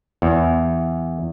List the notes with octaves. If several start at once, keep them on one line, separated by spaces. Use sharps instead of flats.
E2